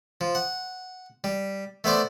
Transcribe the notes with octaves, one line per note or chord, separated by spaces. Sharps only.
F3
F#5
G3
A3 B3 C5 D5